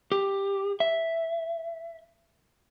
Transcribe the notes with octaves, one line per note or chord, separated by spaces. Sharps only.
G4
E5